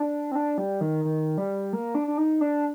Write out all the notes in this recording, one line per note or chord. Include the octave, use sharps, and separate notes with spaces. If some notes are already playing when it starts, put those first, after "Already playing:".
Already playing: D4
C4
D4
G3
D#3
D#3
G3
A#3
D4
D4
D#4
D4